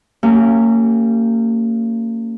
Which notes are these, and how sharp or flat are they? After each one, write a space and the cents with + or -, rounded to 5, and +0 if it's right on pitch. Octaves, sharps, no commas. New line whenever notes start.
A#3 -35 C#4 +0 G4 -5